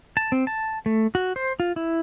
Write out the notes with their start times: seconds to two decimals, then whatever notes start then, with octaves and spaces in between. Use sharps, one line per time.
0.17 A5
0.32 C4
0.47 A5
0.86 A3
1.15 F#4
1.36 C5
1.60 F4
1.76 E4